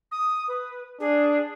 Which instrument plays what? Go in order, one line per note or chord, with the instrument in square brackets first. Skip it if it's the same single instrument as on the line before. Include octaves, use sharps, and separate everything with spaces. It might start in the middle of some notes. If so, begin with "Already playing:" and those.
[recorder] D#6
B4
[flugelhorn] D4 [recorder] G#4